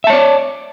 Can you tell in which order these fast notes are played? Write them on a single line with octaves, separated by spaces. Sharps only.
E5 A5 C#5 D5